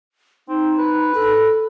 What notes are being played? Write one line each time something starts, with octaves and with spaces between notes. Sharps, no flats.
C4 D#4
B4
A4